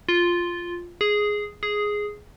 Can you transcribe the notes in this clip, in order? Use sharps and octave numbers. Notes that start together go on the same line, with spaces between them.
F4
G#4
G#4